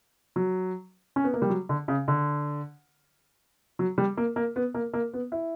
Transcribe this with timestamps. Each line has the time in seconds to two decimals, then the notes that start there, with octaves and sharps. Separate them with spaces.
0.36 F#3
1.16 C#4
1.24 B3
1.34 A#3
1.42 G3
1.50 F#3
1.69 D3
1.88 C#3
2.08 D3
3.79 F#3
3.98 G3
4.17 A#3
4.36 A#3
4.56 B3
4.74 A#3
4.94 A#3
5.14 B3
5.32 E4